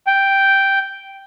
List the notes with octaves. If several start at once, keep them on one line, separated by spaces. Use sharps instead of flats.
G5